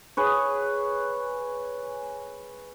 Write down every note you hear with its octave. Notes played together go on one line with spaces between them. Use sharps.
G#4 B4 C#5